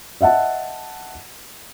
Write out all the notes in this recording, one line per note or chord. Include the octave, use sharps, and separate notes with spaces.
D#5 E5 F#5 A5